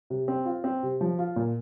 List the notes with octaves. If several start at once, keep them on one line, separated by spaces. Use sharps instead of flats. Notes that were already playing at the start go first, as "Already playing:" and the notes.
C3
C4
F4
C4
C3
F3
F4
A#2